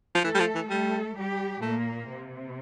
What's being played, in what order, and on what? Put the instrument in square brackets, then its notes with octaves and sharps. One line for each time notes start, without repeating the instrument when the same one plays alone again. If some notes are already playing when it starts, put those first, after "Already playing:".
[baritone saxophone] F3
[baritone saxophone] E3 [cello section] A3 A4
[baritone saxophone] G3
F3
E3
[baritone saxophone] G3 [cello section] A3 A4
[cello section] G3 G4
[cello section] A#2 A#3 [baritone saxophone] A3
[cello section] C3